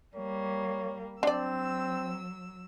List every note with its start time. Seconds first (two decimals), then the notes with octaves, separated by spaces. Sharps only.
0.15 G3 A#3 C#5
1.23 F#3 C4 D4 D5 E6